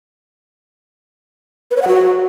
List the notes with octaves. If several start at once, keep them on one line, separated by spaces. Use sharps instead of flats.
B4
C#5
F#5
F#4